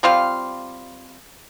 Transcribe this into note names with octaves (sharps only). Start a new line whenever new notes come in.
G3 C4 F4 F5